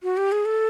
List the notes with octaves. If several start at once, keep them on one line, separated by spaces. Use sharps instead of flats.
F#4
G4
G#4
A4